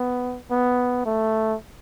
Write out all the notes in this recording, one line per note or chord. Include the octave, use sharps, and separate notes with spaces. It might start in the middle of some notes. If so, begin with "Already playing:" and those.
Already playing: B3
B3
A3